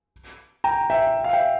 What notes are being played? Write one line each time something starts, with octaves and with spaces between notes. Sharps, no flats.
G5 A#5
E5 G5
F5
E5 G5